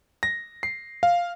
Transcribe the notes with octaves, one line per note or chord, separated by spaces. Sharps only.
A#6
C7
F5